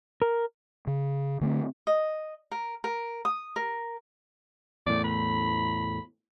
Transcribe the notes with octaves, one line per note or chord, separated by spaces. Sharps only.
A#4
C#3
D3 A3 B3 C4
D#5
A#4
A#4
D#6
A#4
E2 A2 D5
B5